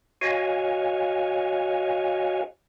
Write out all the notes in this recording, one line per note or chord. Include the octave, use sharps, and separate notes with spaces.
F#4 C#5 D#5 F5 G#5